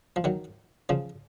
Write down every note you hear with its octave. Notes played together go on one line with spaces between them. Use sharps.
F3
D#3 F#3
C#3 F3